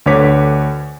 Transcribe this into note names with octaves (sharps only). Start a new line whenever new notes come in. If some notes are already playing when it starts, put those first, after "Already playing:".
D2 D3 B4 C#5 D6 B6